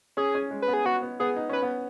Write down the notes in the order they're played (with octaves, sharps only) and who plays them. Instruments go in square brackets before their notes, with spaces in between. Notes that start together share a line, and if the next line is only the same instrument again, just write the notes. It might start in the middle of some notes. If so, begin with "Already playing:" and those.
[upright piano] C#4 [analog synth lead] G#4
[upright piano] C#4
G#3
[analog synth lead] B4
[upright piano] B3
[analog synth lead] G#4
[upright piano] B3 [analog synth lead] F#4
[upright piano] B3
[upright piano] B3 [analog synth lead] G#4
[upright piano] D#4
[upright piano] C#4 [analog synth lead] B4
[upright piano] B3